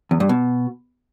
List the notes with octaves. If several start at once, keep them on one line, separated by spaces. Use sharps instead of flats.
E2
G2
B2